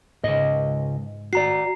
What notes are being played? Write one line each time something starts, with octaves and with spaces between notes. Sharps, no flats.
C#2 G#2 D#5
F#4 D5 A#5 C7